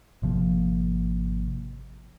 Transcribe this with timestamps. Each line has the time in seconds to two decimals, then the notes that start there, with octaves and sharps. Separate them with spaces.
0.22 G#1 C3 F3 A#3